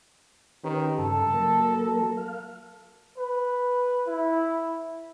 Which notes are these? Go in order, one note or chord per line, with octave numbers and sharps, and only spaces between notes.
D#3 C#4 G4 B4
G2 C#3 A4
F#3 A#3 A#4
F5
B4
E4